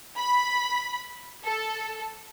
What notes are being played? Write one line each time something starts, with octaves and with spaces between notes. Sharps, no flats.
B5
A4